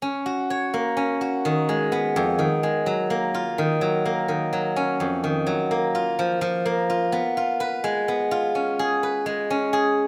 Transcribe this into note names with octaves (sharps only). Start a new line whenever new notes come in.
C#4
F#4
C#5
A#3
C#4
F#4
D#3
G#3
B3
F2
D#3
G#3
F#3
A#3
F4
D#3
F#3
A#3
D#3
F#3
C#4
F2
D#3
F#3
A#3
F4
F3
F3
A#3
F4
B3
F4
B4
G#3
B3
F4
C#4
G#4
B4
G#3
C#4
G#4